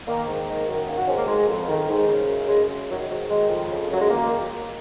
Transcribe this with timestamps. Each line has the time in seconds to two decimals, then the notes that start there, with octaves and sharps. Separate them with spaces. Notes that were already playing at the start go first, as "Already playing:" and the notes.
0.08 D#3 A#3
0.27 G#2
0.48 D#3
0.68 F#2
0.88 D#3 A#3
0.98 F#4
1.08 G#2 C#4
1.18 A#3
1.28 D#3 G#3
1.49 F2
1.68 D#3
1.89 G#2
2.08 C#3
2.29 F#2
2.49 C#3 G#3
2.69 F#2
2.89 D#3 F#3
3.09 G#2 F#3
3.29 D#3 G#3
3.49 F2
3.70 C#3
3.89 F#2 F#3
4.01 G#3
4.10 D#3 A#3